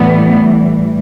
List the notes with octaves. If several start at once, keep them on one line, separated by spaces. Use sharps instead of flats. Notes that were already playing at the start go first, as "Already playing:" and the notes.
Already playing: A2 E3 G3 B3